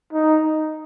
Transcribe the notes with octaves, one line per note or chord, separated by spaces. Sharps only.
D#4